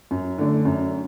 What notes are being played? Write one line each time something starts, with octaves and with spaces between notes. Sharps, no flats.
F#2
D3 A3 D4
F#2